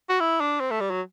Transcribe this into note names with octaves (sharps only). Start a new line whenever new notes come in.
F#4
E4
D4
C4
A3
G3
F#3